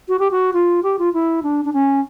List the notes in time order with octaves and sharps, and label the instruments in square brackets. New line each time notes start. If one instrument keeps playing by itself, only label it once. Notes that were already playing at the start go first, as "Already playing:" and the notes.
[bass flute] F#4
G4
F#4
F4
G4
F4
E4
D4
D4
C#4